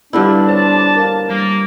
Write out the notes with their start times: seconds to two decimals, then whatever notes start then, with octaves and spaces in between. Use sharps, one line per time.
0.13 G2 D3 B3 D4 E4 F4
0.47 C5 C#5 A5
0.96 A#4 F5
1.29 G3 A#3